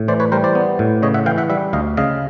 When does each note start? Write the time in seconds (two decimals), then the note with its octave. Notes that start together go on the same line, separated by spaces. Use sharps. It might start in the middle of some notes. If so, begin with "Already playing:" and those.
Already playing: A2
0.08 E3 C5 D5
0.20 B4 C#5
0.32 G3 A#4 C5
0.44 C5 D5
0.55 B3
0.79 A2
1.02 C#3 C#5 D#5
1.14 E5 F#5
1.26 E3 F5 G5
1.38 E5 F#5
1.50 G3 E5 F#5
1.73 D2 D#5 F5
1.97 C#3 D#5 F5